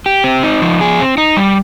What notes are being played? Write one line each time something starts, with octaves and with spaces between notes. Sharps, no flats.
G4
C4
D#4
F3
G#4
C4
D#4
G3